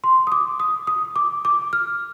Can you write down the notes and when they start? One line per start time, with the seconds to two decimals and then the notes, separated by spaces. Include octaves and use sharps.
0.04 C6
0.27 D#6
0.32 D6
0.60 D#6
0.87 D#6
1.16 D6
1.45 D6
1.73 F6